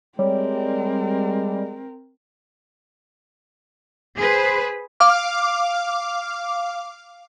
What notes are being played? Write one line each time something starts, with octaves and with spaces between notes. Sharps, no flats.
G3 G#3 C4 A#4 C#5
G#4 B4 C5
F5 D6 F6